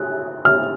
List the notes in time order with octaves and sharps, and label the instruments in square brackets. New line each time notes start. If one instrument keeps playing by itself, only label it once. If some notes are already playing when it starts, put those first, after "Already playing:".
Already playing: [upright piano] F#6
F6